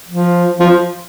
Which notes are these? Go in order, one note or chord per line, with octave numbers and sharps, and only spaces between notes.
F3
F3